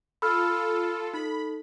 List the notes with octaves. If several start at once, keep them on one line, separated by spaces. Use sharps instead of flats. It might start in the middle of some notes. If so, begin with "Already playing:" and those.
F4 A4 B5 E6 F6
D#4 A4 B5